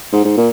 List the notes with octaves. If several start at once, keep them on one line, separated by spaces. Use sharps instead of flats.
G#2
G#2
A#2